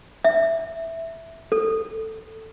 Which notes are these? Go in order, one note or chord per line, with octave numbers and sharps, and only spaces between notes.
E5
A4